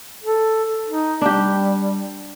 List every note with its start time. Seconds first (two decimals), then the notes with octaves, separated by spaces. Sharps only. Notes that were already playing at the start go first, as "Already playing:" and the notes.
0.23 A4
0.88 D#4
1.22 G3 D4 G4